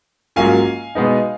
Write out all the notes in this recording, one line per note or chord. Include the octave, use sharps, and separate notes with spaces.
G#2 F#3 A#3 C#4 F4 F5 G#5
B2 G#3 B3 D#4